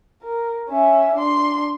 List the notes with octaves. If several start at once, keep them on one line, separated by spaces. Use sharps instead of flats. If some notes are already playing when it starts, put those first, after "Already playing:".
A#4
C#4 E5
D4 C6